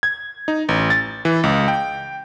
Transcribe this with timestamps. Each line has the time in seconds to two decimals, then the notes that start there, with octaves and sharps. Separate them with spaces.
0.03 G#6
0.48 D#4
0.69 A1
0.90 A6
1.25 E3
1.43 C#2
1.68 G5